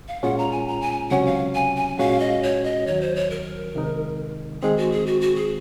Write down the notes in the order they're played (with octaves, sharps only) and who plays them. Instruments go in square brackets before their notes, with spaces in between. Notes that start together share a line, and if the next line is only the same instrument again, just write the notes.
[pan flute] F5
[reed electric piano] A#2 G#3 C#4 F4 G#4 [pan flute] F#5
[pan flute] A#5
G#5
A#5
G#5
[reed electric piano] C#2 C3 F#3 C#4 [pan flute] F#5
[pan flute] F5
G#5
G#5
[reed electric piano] A#2 G#3 C#4 F#4 [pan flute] F5
[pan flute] D#5
C#5
D#5
[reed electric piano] D#2 D#3 F#3 [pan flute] C#5
[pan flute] C5
C#5
A#4
[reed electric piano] C2 C3 D#3 G#3 D#4
[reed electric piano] D#3 G#3 C4 [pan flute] G#4
[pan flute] F#4
G#4
F#4
F#4
G#4